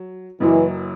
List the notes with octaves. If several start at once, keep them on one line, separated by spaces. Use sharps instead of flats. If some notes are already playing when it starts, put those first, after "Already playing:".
Already playing: F#3
F#1 F#2 E3 F#3